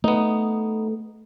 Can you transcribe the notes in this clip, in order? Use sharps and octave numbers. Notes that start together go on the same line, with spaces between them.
A3 B3 D#4